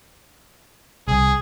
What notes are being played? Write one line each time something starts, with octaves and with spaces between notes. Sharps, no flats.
C2 G#4